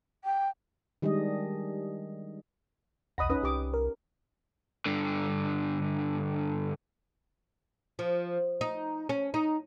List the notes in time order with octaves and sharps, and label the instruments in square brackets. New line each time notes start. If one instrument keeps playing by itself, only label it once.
[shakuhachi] G5
[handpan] D#3 G3 G#3 D4 D#5
[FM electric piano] B1 D#5 A#6 [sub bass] E2 [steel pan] F#5 B5 D#6
[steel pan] C#4 D#4 B4 [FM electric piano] D#6
[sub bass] C2 [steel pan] G4 D6
[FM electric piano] A#4
[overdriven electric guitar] G2 D3
[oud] F3
D#4
C#4
D#4